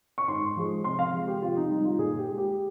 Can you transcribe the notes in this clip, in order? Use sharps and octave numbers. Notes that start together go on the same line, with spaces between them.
C#6
G#2 C6
F3 G#3
C3 C6
F5
F3 G#3
G4
C3 F4
D#4
G3 D#4
F4
A#2 G#4
G4
G#3
G4